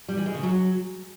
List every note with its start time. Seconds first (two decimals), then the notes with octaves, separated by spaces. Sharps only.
0.09 G3
0.17 E3
0.26 G#3
0.34 C#3
0.43 F#3